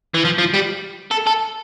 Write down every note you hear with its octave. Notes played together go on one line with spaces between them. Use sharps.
E3
F3
F3
G3
A4
A4